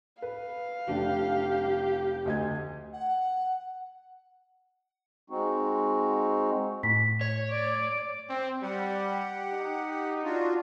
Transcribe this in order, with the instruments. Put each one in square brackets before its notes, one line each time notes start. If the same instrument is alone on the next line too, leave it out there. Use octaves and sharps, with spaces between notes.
[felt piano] B4 [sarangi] F5
[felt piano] F1 D4 [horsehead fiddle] G4
[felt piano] D2 D#5 G#6
[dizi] F#5
[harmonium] G#3 C4 D#4 F#4
[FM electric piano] A2 [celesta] B6
[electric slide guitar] C#5
[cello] D5
[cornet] C4
[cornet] G3 [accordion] G4 F#5
[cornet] D#4
[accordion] D4 F4 F#4